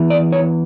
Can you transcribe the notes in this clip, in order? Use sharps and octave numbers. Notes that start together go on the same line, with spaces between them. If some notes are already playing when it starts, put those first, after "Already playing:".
Already playing: E2 E3
D5
C#5